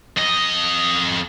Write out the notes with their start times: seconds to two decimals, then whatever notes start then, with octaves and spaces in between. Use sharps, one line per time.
0.17 F2 D#5